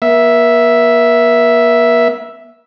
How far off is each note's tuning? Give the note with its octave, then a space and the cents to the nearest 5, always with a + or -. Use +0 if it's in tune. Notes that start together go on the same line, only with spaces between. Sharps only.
A#3 +45 E5 +0